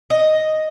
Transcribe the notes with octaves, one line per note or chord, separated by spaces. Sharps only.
D#5